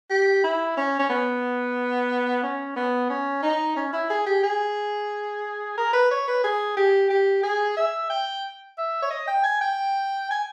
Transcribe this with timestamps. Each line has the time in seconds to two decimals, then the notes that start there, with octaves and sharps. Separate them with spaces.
0.10 G4
0.44 E4
0.77 C#4
0.99 C#4
1.09 B3
2.43 C#4
2.76 B3
3.10 C#4
3.43 D#4
3.76 C#4
3.93 E4
4.10 G#4
4.26 G4
4.43 G#4
5.78 A#4
5.93 B4
6.11 C#5
6.28 B4
6.44 G#4
6.77 G4
7.10 G4
7.43 G#4
7.77 E5
8.10 G5
8.78 E5
9.02 C#5
9.11 D#5
9.27 G5
9.43 G#5
9.61 G5
10.31 G#5